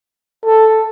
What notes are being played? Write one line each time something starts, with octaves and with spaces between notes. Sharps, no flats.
A4